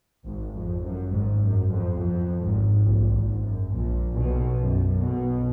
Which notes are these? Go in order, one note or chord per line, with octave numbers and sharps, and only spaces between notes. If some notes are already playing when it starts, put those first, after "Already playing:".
G#1 G#2
F2
F#2
G#1 G#2
F#2
F2
F2
G#1 G#2
A#1 A#2
G#1 G#2
F#2
A#1 A#2
B1 B2
F#2
B1 B2